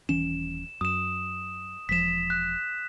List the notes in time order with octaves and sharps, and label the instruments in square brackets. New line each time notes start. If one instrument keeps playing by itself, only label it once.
[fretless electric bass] D#1 E3 C#4 [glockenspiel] E7
[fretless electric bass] F#2 [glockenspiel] D#6 E7
[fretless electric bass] E1 F3 [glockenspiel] B6 E7
[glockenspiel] F#6